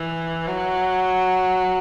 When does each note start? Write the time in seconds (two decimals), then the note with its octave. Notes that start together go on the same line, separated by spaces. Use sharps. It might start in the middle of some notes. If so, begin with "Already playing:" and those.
Already playing: E3
0.47 F#3